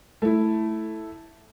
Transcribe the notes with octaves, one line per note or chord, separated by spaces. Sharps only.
A3 E4